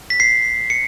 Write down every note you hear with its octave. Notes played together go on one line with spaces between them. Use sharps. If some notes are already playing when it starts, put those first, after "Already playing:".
B6
C7
C#7